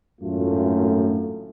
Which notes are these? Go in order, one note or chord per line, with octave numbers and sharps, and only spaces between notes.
G#1 F#2 A2 A3 F4